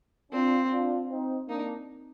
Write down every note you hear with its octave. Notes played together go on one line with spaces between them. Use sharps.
C4 D4 F4
D4 F4
C4 D#4
A#3 D4 D#4